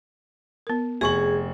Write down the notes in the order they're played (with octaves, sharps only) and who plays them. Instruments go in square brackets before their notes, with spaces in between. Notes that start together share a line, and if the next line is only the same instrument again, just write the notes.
[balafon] B3 A#4
[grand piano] F1 C#6 F#7 [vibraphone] G#4 [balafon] G#5